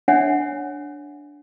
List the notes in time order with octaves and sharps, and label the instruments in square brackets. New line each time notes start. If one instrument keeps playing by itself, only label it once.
[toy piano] D4 C#5 E5 F#5 G#5